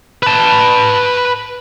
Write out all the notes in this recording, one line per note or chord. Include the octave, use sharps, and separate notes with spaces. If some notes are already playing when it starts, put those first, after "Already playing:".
B4 A5